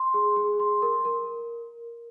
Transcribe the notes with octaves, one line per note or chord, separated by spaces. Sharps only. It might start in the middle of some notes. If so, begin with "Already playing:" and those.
Already playing: C6
G#4
G#4
C6
A#4
A#4